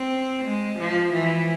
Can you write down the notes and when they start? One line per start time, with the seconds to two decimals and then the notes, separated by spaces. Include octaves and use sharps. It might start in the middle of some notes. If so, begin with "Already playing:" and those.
Already playing: C4
0.45 G#3
0.79 F3
1.13 E3